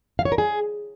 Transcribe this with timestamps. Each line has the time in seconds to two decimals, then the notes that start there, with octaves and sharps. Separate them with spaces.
0.19 F5
0.25 C#5
0.32 A#4
0.38 G#4